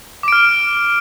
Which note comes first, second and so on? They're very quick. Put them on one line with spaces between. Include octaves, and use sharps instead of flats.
D6 D7 F6